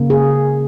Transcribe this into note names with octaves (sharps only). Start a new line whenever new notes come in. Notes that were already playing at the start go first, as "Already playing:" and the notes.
Already playing: C#3 A#3
G#4